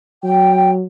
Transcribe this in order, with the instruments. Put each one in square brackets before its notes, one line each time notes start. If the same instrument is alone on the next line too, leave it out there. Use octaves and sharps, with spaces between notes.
[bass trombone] F#3 [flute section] G5